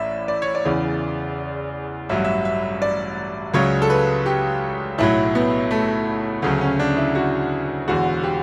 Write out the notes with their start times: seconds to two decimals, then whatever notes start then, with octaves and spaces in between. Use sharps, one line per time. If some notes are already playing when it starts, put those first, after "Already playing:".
Already playing: A1 A2 D5 E5
0.28 D5
0.42 C#5
0.55 D5
0.65 E2 C#3 E3
2.09 A1 G2 F#3 E5
2.25 E5
2.45 E5
2.82 D5
3.54 C#2 C#3 F#3 C#5
3.82 A4
3.90 B4
4.26 G4
4.98 B1 A2 F#3 E4
5.35 B3
5.71 A3
6.42 D2 C#3 F#3 A3
6.61 C#4
6.79 D4
6.97 E4
7.15 F#4
7.88 E1 E2 D3 F#4
8.23 G4